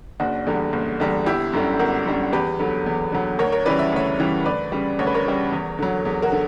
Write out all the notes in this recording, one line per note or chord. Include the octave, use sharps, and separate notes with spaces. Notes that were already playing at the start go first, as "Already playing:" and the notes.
F#1 D4 F#4
E2 D3 G3
F#1
E2 D3 G3
G1 E4 G4
F#2 D3 G3
G1 F#4 A#4
F#2 D3 G3
E2 G4 B4
D3 F#3
E2
D3 F#3
D2 A#4 C#5
A#4 C#5
C#3 E3 G3 B4 D5
E5
D2 C#5 E5
C#3 E3 G3
D2 B4 D5
C#3 G3
D2 C#5
B4
A#4 C#5
C#3 G3
E2
D3 F#3
E2
F#4 A#4
D3